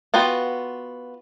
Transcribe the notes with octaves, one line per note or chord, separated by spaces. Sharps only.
B3 F4 F#4 B4 G5